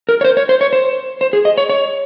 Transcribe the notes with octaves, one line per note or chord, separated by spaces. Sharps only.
A#4
C#5
C5
C#5
C5
C#5
C5
C5
G#4
D#5
C#5
C#5